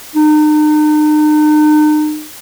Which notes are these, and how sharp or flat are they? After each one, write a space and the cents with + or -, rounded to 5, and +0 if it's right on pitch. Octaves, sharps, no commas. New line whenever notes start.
D#4 -40